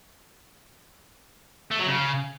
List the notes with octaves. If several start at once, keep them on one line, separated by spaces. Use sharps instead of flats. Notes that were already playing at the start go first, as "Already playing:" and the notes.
A3
F#3
C#3